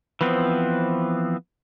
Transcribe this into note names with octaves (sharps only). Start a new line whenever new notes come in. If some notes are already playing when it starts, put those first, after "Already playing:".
E3 F3 B3 C4